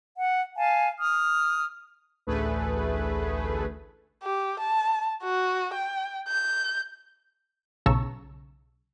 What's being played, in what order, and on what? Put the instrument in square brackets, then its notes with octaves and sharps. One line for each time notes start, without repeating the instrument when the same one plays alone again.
[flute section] F#5
F5 G#5 A5
D#6 F6
[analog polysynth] A1 D2 A3 G#4 B4
[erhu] G4
A5
F#4
G5
G6
[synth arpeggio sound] B1 C#3 A5 A#5 C#6 E6